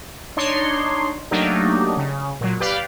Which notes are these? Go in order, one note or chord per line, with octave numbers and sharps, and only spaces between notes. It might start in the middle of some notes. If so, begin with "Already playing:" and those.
D4 D#4 C#5 C6
F#3 A3 A#3 D4 D#4 G4
C#3
A#2 F#3
G4 B4 D5 F5